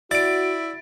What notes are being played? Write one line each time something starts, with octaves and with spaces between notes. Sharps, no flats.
E4 F#4 D5 A6 D7